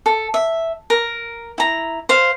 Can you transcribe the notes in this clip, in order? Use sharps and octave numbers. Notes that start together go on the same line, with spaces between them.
A4
E5
A#4
E4 A#5
C5 F5